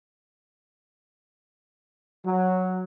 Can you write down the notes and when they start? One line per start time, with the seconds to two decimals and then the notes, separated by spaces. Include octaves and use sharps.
2.25 F#3